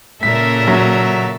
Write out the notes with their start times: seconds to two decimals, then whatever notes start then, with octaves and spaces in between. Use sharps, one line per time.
0.23 A#2 C#3 A4 A#4 E5 B6
0.68 F#3